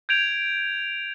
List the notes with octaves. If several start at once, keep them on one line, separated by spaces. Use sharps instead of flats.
G6 G#6 D7 F7